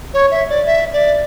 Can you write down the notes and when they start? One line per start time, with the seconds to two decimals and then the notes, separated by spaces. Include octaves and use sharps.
0.14 C#5
0.31 E5
0.50 D5
0.66 E5
0.93 D5